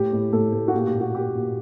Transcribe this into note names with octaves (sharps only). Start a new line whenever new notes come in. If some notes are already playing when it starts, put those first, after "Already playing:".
Already playing: A2 G4
A2
A2 A4
A2
F#4
A#2 G4
G4
A#2
F#4
A#2 G4
A#2